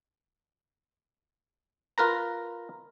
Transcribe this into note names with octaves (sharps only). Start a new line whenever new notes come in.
F4 A#4 B4 A#5